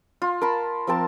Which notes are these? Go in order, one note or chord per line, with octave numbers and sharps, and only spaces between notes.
F4
A#4 A5 B5
F3 C4 A#4 A5